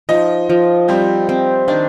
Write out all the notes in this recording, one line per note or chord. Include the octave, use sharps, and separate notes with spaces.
F3 D#4 D#5
F3
G3 C4 G4
C4
D#3 D4 D#4